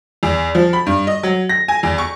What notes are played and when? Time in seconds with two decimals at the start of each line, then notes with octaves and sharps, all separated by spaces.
0.23 E2
0.55 F3
0.73 B5
0.86 G2
1.07 D#5
1.23 F#3
1.49 A#6
1.68 G#5
1.83 E2
1.98 C#6